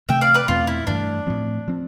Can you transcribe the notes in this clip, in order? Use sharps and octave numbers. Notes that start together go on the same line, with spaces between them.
C3 E3 A3 E5 G5
D5 F5
B4 D5
E2 B2 A3 C4 F4
E4
G2 E3 A3 D4
A2 F3 C4
F3 C4